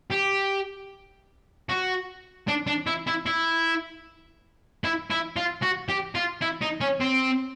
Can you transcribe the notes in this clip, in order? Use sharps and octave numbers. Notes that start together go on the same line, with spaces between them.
G4
F#4
D4
D4
E4
E4
E4
E4
E4
F4
F#4
G4
F4
E4
D#4
C#4
C4